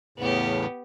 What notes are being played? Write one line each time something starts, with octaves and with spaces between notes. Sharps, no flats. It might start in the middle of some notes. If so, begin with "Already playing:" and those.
E2 A2 C#3 B3 G4